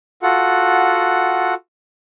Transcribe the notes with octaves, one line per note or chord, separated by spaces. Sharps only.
F4 F#4 A4 F#5